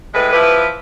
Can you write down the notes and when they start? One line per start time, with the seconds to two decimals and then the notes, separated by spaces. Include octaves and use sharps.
0.14 A2 G#3 B4
0.33 F3 E4 G4 B4